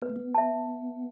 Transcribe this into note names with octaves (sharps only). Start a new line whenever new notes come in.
B3 B4
A3
B3
E5 A5